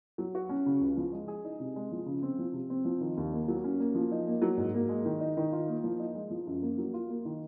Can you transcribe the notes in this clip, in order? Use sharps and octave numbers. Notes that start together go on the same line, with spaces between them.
F#3
F#4
C#4
C#3
C#2
F3
G#3
G#4
D#4
C3
G#3
F3
C#3
C4
F3
C3
C4
F3
D#3
D#2
A#3
F#3
C#4
A#3
F3
D#4
A#3
F#3
G#2
A#3
G#3
D#3
D#4
D#3
F4
A#3
F3
D#4
G#3
F3
F#2
A#3
F#3
F4
A#3
D#3